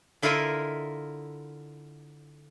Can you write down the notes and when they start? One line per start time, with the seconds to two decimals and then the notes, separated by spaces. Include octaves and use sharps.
0.22 D3 E4 F4 A#4 D#5 E5